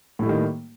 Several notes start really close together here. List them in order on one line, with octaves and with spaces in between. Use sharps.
A2 A3 G3 D#3 A#3